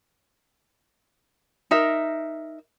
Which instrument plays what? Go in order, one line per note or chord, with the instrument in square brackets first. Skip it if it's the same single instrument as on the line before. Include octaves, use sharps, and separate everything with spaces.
[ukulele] D#4 A#4 E5